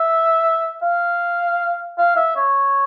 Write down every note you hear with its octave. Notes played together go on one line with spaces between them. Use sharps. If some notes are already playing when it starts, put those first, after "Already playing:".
Already playing: E5
F5
F5
E5
C#5